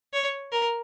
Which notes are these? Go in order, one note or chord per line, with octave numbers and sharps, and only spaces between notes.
C#5
A#4